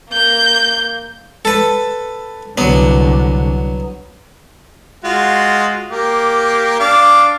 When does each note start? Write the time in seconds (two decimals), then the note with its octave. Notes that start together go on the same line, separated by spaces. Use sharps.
0.10 A#3 G6
1.45 A4 B4
2.58 C2 D3 F#3 B3
5.04 G#3 F4 F#4
5.90 A#3 G4
6.80 D4 F5 D6